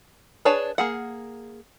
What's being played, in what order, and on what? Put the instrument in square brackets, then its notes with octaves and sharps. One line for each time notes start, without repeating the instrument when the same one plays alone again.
[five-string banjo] D4 G#4 B4 C#5 A5
A#3 G#4 F#5